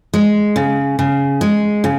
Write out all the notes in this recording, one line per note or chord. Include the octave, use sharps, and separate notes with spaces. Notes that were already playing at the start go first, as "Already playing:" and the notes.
G#3
C#3
C#3
G#3
C#3